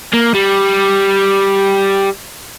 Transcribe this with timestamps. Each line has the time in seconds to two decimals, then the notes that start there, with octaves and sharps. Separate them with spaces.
0.13 A#3
0.34 G3